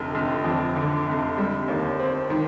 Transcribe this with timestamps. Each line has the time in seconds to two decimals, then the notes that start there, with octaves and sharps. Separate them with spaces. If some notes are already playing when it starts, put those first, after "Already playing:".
Already playing: F1 D3
0.15 F1
0.44 F2
0.76 D3
1.07 F1
1.38 G3
1.68 D#2
1.99 C4
2.30 D#3